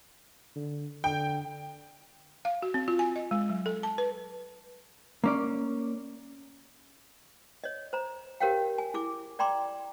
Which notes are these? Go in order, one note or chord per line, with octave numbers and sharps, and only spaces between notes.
D3
D3 G5
F5
F#4
C4
F4
G#5
D#5
G#3
F#3
A4
A5
B4
A#3 C#4 D5
C#5 D#5
C5 A#5
G4 A#4 C5 C#5 F5 G5
G#5
E4 G#4 D6
D5 G5 A#5 C6 D6